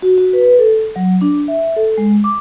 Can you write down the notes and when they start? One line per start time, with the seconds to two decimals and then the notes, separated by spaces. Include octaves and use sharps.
0.02 F#4
0.18 F#4
0.33 B4
0.59 A4
0.96 F#3
1.21 D4
1.48 E5
1.76 A4
1.98 G#3
2.24 D6